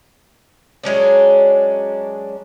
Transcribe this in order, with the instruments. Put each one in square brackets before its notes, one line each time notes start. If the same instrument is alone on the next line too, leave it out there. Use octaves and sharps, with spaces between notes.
[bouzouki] F#3 G#3 C#4 D4